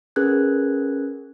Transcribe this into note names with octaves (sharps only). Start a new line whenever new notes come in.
C#4 G#4 A#4 B4 F#6 G#6